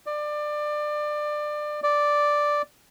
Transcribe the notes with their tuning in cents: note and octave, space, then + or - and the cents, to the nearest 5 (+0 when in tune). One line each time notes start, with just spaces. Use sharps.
D5 +25
D5 +0